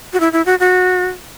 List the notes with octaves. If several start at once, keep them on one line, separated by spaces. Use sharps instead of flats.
F#4
E4
E4
F#4
F#4